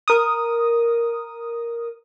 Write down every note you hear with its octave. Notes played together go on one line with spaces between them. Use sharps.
A#4 D#6